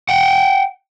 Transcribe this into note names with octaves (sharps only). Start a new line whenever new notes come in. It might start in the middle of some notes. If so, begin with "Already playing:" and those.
F#5 G5